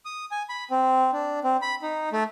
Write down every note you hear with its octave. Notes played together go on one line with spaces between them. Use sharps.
D#6
G#5
B5
C4
D4
C4
B5
D#4
A3